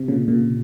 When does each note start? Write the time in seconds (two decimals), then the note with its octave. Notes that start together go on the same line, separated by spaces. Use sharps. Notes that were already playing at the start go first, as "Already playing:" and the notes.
Already playing: C3
0.08 A#2 C#3
0.28 A#2 C#3